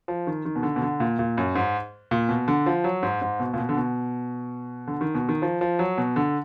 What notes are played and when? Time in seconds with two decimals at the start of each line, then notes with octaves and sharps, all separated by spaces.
0.08 F3
0.27 D#3
0.45 D#3
0.56 B2
0.63 D3
0.76 B2
0.82 D3
1.00 A#2
1.19 A#2
1.37 F#2
1.55 G#2
2.11 A#2
2.29 B2
2.48 D3
2.66 F3
2.84 F#3
3.03 G#2
3.22 G#2
3.40 B2
3.54 A#2
3.58 B2
3.69 D3
3.77 B2
4.88 D3
5.01 D#3
5.15 B2
5.29 D#3
5.42 F3
5.61 F3
5.79 F#3
5.98 B2
6.16 D3